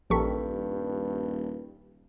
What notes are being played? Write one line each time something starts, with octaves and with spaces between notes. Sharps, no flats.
D#1 A#1 G2 G4 A4 A#4 C#6 B6